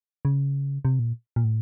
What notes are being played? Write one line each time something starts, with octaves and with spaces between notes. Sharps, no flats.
C#3
C3
A#2
A#2
A2